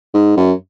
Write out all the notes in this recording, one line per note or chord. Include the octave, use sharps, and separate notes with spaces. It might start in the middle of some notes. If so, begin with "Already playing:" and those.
G#2
F#2